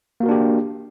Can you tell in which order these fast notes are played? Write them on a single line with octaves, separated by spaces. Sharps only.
A#3 F#4 A#4 D4 G4